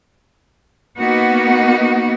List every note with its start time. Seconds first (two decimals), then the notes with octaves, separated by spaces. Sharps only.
0.99 A#3 B3 D#4 F#4